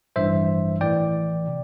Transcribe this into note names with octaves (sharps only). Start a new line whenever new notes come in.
A1 G2 E3 C5 E5
A1 A2 E3 D5 G5
C3